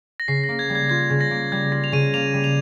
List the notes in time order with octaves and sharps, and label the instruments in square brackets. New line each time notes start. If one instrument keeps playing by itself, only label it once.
[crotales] A#6
[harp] C#3 [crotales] C7
[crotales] A#6
[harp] A#3
[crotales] G#6
[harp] G3
[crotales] G#6
[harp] F4 [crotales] G#6
[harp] C#3
[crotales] A#6
[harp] A#3
[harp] G3 [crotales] G#6
[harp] F4 [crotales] A#6
[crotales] F7
[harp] C#3 [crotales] D#7
[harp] A#3 [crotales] F7
[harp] G3
[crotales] F7